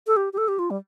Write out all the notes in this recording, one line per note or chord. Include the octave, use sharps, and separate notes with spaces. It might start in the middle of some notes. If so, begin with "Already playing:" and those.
A4
G4
G4
A4
G4
F4
G3